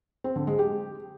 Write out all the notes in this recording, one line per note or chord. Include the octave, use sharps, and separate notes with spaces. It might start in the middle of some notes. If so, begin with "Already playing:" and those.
C4
D3
G#3
G4